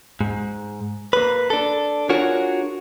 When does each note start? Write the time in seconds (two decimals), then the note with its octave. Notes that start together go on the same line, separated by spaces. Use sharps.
0.21 G#2
1.13 A#3 B4
1.50 D4 A4
2.09 D4 F4 F#4 G#4 A#4 C#5